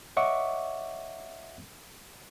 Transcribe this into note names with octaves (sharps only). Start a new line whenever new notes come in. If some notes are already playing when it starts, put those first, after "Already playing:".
C#5 D#5 E5 F#5 C#6 D6